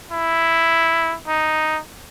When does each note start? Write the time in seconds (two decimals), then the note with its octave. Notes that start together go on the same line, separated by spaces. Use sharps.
0.11 E4
1.27 D#4